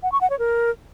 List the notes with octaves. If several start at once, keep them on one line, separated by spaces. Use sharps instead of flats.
F#5
C#6
F#5
C#5
A#4